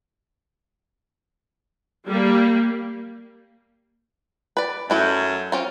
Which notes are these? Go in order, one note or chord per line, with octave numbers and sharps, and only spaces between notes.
G3 A#3
B4 D5
F#2 A3 E4 A4
C4 C#4 F4